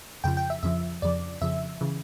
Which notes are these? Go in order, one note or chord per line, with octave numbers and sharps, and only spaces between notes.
F2 C#3 F3 G5
G5
E5
F2 C#3 F3 E5
F2 C#3 F3 D5
F2 C#3 F3 E5
C#3 E3